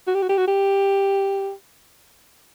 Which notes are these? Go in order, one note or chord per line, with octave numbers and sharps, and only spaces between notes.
F#4
G4
F#4
G4
F#4
G4